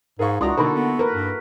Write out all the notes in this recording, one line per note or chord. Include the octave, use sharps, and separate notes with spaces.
G#2 G#4 A#4 F5 C#6
C#2 D4 E4 F#4 A#5 C6 D#6
B2 D3 A#3 D#4 A4 B5 C6
B3
A#3 A#4 B4
G2